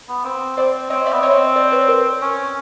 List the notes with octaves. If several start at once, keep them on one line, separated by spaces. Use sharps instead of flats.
B3
C4
C4 C5 D5
C4 C#5 D#5
D5 E5
B3
C4 C#5 D#5
C5 D5
B4 C#5
A#4 C5
C#4